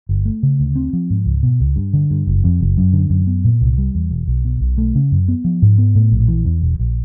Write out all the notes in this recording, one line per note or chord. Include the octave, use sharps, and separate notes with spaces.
G1
A3
C#3
D2
C4
F3
G#2
C#2
B2
C#2
G2
D3
G2
F#1
F2
F#1
F#2
D3
F#2
B3
A#2
C2
G3
E2
E1
B1
B2
B1
A3
C#3
F#2
B3
F3
G#2
B3
A2
A#1
E3
E2
E1
A#1